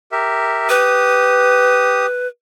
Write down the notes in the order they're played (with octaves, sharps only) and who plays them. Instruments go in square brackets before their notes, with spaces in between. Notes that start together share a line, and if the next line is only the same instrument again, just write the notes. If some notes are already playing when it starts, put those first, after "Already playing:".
[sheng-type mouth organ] G4 A#4 E5
[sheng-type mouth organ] G4 D#6 [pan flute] B4